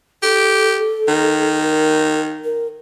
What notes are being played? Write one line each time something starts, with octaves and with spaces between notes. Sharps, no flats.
G4 A4
D#3
A#4
A#4